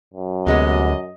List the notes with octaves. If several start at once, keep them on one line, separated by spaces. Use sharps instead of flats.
F#2
D2 C3 G#3 B3 D#5